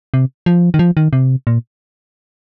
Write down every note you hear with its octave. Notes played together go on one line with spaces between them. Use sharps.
C3
F3
D#3
F3
D#3
C3
A#2